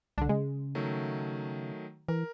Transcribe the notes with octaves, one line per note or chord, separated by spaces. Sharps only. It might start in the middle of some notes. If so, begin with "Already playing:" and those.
C2 D3 D4
C#3 G#3
D#3 F#3 A3
E3 A#4